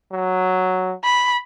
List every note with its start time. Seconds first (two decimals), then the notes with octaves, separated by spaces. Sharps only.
0.12 F#3
1.04 B5